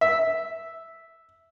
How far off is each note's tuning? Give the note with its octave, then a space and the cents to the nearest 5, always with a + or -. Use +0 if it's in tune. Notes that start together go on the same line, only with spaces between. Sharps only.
E5 +0